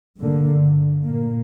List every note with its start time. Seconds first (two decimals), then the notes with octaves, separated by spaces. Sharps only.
0.20 G2 D3 A#3
1.04 A#2 A#3